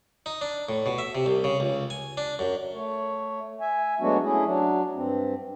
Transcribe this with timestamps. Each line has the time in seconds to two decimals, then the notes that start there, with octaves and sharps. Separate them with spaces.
0.26 D#4
0.41 D4
0.69 A2
0.86 B2
0.98 E5
1.15 C3
1.26 C2
1.44 C#3
1.60 C#2
1.90 G#5
2.17 D4
2.39 F#2
2.73 A3 C#5
3.61 E5 G#5
4.01 F#3 G#3 A3 B3 D4 F#4
4.22 A3 C#4 E4 G#4
4.45 F#3 D4
4.95 G2 C4